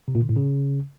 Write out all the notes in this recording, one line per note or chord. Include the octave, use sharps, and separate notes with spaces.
C3
A#2
D3
A2
C#3